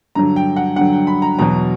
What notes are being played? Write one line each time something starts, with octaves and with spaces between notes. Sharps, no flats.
G2 D3 F#3 A#5
G5
F#5
G2 D3 F#3 F#5
G5
B5
A#5
E2 B2 F#3 A#5